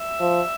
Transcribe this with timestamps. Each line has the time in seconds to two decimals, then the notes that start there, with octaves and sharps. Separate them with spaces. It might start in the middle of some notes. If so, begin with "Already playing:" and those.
Already playing: E5
0.20 F3